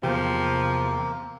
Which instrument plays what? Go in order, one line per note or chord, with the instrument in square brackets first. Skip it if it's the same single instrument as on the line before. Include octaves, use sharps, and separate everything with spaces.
[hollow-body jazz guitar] E2 G4 [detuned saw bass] C3 [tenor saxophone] F3 [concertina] A#3